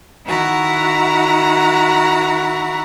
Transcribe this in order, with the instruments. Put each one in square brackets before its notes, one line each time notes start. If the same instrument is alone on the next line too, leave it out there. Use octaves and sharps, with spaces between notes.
[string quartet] D#3 E4 F#4 F#5 A#5